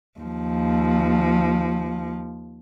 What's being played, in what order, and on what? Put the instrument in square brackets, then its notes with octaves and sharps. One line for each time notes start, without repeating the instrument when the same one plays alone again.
[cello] D#2 F3